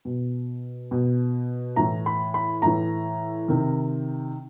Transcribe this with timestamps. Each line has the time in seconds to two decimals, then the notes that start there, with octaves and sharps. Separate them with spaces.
0.05 B2
0.91 B2
1.76 A2 E3 A#5
2.06 B5
2.34 B5
2.62 A2 E3 A#5
3.48 C3 D#3